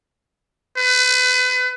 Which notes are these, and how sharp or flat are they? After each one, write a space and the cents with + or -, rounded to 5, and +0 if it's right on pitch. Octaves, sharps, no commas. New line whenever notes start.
B4 +35